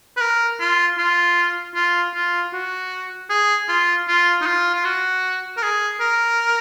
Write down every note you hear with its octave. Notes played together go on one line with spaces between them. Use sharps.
B4
A#4
F4
F4
F4
F4
F#4
G#4
F4
F4
D#4
F4
F4
F#4
A#4
G#4
A#4